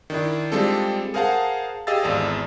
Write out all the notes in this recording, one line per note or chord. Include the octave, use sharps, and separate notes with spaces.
D#3 D4 E4
G3 G#3 C4 D4 F4 A4
G#4 A#4 C5 F5 F#5 A5
G4 G#4 D#5 F5 E6 A6
G#1 E2 A4 D5